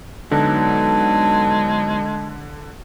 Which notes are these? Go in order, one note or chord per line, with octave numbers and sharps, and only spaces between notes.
D3 F#3 G#3 B3 D#4 A5